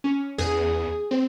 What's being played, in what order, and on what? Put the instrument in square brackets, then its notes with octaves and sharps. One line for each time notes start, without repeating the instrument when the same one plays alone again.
[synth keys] C#4
[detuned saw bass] E2 [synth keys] G#4
[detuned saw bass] C4